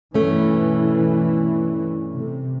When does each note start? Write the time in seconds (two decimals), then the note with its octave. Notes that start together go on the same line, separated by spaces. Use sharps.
0.14 G2 B2 E3 A3 C#4
2.15 C3